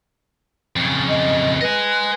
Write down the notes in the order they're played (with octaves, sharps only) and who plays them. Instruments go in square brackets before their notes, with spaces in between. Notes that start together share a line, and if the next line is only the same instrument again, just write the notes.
[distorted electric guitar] F2 C#3
[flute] D#5
[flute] B4 [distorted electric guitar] D#5 G#5